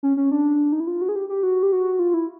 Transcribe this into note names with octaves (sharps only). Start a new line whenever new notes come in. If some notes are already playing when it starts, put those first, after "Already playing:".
C#4
C#4
D4
D#4
E4
F4
F#4
G#4
G4
G4
F#4
G4
F#4
F4
E4